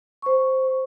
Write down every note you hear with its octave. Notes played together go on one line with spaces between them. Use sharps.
C5 C#6